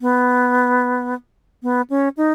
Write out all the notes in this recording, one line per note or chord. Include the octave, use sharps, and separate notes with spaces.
B3
B3
C#4
D#4